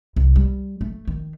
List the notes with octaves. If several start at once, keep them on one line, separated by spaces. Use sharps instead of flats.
C2
G3
A3
D#3